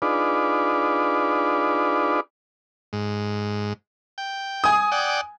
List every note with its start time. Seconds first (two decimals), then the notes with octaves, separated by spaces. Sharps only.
0.02 D4 D#4 F4 G#4 B4 D5
2.93 G#2
4.18 G5
4.64 G#5 D#6
4.92 D5 F#5 G5